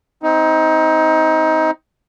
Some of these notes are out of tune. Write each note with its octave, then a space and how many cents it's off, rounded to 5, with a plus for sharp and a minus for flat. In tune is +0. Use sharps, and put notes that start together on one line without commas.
C4 -5 D#4 +25